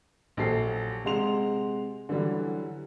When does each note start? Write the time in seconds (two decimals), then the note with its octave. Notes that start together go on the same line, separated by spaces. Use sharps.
0.37 A#1 F#3 G4 A4 C7
1.05 C3 G#3 F#5 C6 F7
2.09 D3 E3 F#3 G3